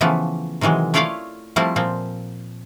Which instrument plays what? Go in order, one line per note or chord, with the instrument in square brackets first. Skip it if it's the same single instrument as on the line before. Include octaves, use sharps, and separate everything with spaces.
[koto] C#3 E3 F3 A3 B3
C3 D#3 E3 F#3 G#3
A3 E4 F4 C#5 D5 F5
F3 G3 A3 C4 E4
A#2 F3 C4